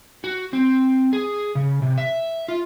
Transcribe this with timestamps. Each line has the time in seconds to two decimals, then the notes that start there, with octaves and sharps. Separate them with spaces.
0.24 F#4
0.53 C4
1.13 G#4
1.55 C#3
1.82 C3
1.98 E5
2.48 F4